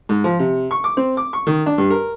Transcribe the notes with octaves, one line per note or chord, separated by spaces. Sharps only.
G#2
F3
C3
C#6
D6
C4
D6
C#6
D#3
D4
G2
A#4